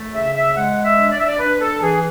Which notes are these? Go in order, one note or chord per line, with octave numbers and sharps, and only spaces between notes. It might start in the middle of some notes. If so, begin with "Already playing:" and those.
Already playing: A3
C#3 E5
E5
G#3 F#5
E5
D4
D5
E5
D5
D4 B4
A4
E3 G#4